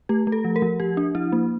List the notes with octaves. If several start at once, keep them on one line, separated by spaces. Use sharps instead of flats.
A3 G4
A3
A4
F3
A#4
F3
F3 G4
D4
F3 E4
A#3